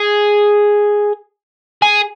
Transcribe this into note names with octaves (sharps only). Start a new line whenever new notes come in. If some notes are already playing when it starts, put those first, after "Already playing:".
Already playing: G#4
G#4